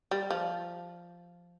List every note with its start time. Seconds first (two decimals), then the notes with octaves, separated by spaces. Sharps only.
0.11 G3
0.30 F3